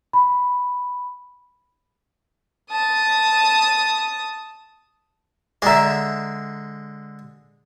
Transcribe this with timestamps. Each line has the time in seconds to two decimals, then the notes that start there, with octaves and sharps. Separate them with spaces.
0.13 B5
2.71 A5 D#6
5.62 D3 G#3 D5 E5 G5 A#5